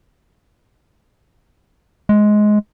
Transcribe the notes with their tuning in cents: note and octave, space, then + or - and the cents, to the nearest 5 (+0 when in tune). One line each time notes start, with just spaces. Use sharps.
G#3 +15